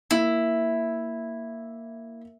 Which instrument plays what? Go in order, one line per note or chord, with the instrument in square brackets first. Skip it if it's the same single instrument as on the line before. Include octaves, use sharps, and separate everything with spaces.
[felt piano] A#3 E5 [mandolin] E4